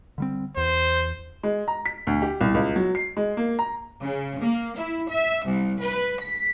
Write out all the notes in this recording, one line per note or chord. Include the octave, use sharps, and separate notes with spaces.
D3 G3 C4
E2 C5
G#3
A#5
B6
D2
G4
C2
C#2
F#3
C7
G#3
A#3
A#5
C#3
A#3
E4
E5
C2
B4
B6